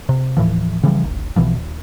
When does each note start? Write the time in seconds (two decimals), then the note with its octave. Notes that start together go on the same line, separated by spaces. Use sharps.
0.09 C3
0.37 D#1 A2 E3 F3
0.83 C#3 E3 F3 G3
1.04 D1 G#1
1.36 B1 B2 E3 F3
1.56 D#1